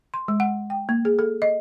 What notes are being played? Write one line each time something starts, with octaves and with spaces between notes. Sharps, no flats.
C6
G#3
F#5
G5
A#3
G#4
A4
D#5